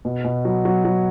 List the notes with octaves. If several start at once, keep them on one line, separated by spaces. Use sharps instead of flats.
B2
B2
F#3
F#3
F#3